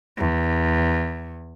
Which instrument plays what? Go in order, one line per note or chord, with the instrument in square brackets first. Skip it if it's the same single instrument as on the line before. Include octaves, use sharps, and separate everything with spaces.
[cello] E2